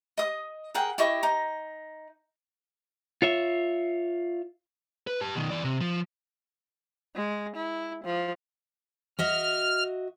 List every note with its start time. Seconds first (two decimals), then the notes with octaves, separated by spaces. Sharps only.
0.18 D#5 D#6
0.75 G#4 A#4 F#5 G5
0.98 E4 G4 D#5 C#6
1.23 D#4 A#5
3.22 F4 C#5 E5
5.07 B4
5.21 G4 A5
5.35 B2 D#3
5.51 E3 D5
5.64 C3
5.81 F3
7.15 G#3
7.56 E4
8.04 F3
9.19 F#4 D#5 E5 F6